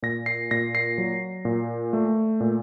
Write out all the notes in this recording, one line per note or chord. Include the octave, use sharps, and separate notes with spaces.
A#2 A#6
C7
A#2 A#6
C7
F#3
A#2
A3
A#2